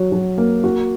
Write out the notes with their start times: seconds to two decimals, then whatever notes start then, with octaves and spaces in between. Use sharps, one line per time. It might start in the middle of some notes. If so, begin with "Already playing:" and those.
Already playing: F#3 F#4
0.12 F#3
0.38 A#3
0.64 F#4